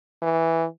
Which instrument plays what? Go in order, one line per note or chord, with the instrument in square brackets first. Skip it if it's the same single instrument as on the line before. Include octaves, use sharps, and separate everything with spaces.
[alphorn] E3